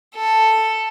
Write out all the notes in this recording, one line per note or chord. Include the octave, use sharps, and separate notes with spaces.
A4